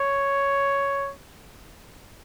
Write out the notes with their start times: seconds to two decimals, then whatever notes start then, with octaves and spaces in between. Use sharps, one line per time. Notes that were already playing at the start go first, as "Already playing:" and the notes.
Already playing: C#5